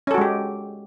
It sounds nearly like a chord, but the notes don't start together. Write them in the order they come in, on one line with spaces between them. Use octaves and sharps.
C#4 A4 F#4 G#3 G4